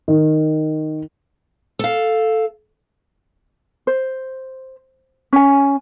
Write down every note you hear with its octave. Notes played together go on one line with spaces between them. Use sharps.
D#3
A4 F5
C5
C#4 G#5